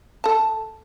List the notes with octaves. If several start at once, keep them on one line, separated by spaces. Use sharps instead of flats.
A4 A5